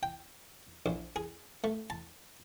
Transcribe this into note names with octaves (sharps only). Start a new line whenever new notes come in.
G5
A#1
G#4
A3
A5